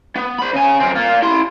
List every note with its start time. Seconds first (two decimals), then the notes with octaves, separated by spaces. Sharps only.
0.16 B3
0.39 C5 B5
0.53 C#3 G#5
0.80 F#2 C4
0.96 A#3 F4
1.23 E4 C6